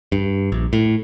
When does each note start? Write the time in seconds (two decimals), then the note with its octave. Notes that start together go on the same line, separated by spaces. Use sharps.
0.12 G2
0.52 A#1
0.73 A2